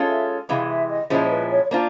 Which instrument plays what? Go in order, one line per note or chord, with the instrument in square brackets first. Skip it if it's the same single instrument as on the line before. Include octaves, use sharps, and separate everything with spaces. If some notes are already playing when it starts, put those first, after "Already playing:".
Already playing: [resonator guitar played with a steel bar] G#3 C#4 F4 A4
[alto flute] E5
[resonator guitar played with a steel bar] C3 E3 G#3 [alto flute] F5
[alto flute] E5
D#5
[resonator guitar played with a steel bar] A#2 F3 G#3 C#4 E4 [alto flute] C5
[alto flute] B4
C#5
C#5
[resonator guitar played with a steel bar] A#3 D4 F4 [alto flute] C5